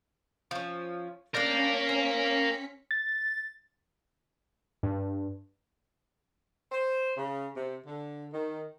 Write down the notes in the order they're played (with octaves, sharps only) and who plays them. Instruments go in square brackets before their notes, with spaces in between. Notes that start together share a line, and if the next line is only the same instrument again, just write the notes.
[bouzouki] F3 C#4
[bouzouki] G3 A#3 D4 [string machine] C#4 B6 C#7 [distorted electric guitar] A#4 F5
[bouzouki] C4
[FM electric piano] A6
[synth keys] G2
[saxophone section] C5
C#3
C3
D3
D#3